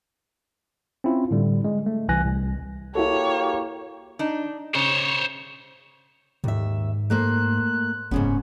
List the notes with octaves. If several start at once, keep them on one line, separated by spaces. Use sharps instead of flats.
C4 C#4 E4 F4
A2 D3 G3
G#3
A3
C2 E3 G#5 F#6 A#6
C2
A#3 E4 F#4 G4 A4 C#5
D4 D#4
C#3 C5 C#5
D#2 G#2 E5
A3 A#3 C5 F#6
F1 G#2 C#3 B3 C#4